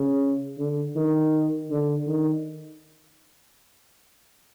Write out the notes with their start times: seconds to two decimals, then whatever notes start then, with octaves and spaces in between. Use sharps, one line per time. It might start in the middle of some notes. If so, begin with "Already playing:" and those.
Already playing: C#3
0.58 D3
0.96 D#3
1.71 D3
2.08 D#3